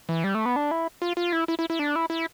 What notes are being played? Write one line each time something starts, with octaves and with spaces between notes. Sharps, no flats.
E3
G3
A3
B3
D4
E4
F4
F4
E4
E4
E4
E4
D4
E4
E4